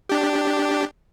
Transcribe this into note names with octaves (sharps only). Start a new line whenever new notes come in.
D4 G4